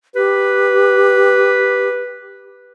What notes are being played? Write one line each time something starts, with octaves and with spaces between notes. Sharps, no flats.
G4 B4